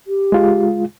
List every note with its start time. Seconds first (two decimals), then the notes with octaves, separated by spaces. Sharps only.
0.07 G4
0.32 G#3 F4